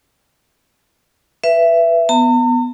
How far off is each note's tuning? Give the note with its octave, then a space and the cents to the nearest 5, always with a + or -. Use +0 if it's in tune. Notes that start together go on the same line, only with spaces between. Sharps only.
B4 +0 E5 +20
B3 +0 A#5 -45